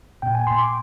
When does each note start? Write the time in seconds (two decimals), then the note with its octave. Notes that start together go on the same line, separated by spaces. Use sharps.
0.22 A#2 G5
0.35 G#5
0.47 A#2 C6
0.59 D6